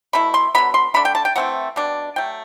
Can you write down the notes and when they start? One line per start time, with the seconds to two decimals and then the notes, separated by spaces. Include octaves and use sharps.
0.13 B2 A3 E4 B5
0.34 C6
0.55 D3 F#3 B3 B5
0.74 C6
0.94 D3 A3 D4 B5
1.05 G5
1.15 A5
1.25 G5
1.36 E3 A3 C4 E4 F#5
1.76 B2 G3 D4
2.16 F#3 A3 G5